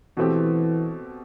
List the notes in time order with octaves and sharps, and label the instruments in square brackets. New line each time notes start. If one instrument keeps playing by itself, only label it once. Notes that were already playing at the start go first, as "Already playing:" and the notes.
[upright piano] B2 A3 C4 G4 [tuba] E3